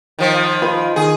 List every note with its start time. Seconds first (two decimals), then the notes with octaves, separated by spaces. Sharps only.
0.19 D#3 F3
0.62 F4 B4
0.96 D#3 G#4